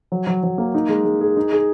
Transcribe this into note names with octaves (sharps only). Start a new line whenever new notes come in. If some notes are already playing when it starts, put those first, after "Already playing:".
F#3
F#3
F#3
A#3
D#4
G#3
G#3
G#4
D#4
G#4